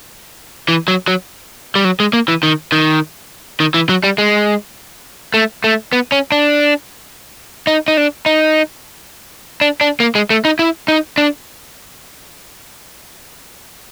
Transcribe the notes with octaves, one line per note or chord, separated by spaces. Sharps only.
E3
F#3
F#3
G3
F#3
G#3
A#3
E3
D#3
D#3
D#3
E3
F#3
G3
G#3
A3
A3
B3
C#4
D4
D#4
D#4
D4
D#4
D4
D4
A#3
G#3
A3
D#4
E4
D#4
D4